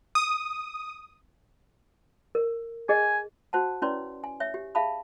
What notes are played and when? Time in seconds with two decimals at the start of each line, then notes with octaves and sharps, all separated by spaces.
0.15 D#6
2.35 A#4
2.89 G#4 D#5 G#5
3.53 F#4 C5 F#5 A5
3.82 C#4 E4 B4 C#5 D5 C6
4.24 G#5
4.40 C#5 E5
4.54 G4
4.75 G#4 E5 F5 A5 B5